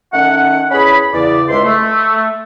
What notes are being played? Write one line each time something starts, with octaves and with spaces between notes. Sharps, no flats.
D#3 A3 C#4 F#5
E2 C#4 G#4 B5
E2 C#3 D5
C#2 G#2 G#3 E5 C6
A3